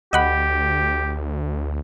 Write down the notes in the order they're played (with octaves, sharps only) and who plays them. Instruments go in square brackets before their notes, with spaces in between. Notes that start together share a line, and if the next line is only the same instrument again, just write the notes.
[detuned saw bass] D2 [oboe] G4 [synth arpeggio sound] D#5 F#5 B5